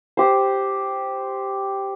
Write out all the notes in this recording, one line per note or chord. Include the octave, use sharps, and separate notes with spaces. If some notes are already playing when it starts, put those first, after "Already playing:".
G4 C5